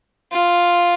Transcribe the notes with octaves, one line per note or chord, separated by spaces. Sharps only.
F4